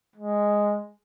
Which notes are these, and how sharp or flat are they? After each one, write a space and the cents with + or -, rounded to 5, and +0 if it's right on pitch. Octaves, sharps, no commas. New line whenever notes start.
G#3 -5